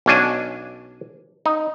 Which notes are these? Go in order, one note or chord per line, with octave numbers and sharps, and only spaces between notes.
B1 C#4 D4 G#5
D#4